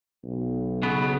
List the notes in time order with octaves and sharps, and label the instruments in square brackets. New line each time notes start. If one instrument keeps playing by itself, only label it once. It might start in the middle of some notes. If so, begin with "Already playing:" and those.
[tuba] B1
[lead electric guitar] C#3 B3